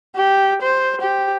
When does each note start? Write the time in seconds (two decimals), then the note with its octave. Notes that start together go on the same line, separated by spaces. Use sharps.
0.16 G4
0.62 C5
1.01 G4